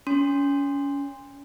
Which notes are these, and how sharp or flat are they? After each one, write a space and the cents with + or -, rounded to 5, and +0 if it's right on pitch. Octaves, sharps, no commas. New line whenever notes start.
C#4 +30 C6 +0